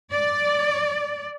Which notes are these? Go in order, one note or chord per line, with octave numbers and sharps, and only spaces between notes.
D5